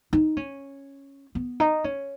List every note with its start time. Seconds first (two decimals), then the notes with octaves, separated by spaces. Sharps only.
0.13 D#4
0.37 C#4
1.35 B3
1.60 D#4
1.84 C#4